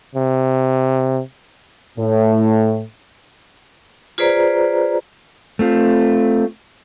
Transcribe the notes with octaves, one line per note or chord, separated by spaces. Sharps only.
C3
A2
F4 G#4 B4 C5 D5 A#5
A3 C4 F4